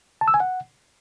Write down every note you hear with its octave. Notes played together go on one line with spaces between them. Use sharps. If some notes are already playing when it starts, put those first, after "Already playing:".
A5
E6
G#5
F#5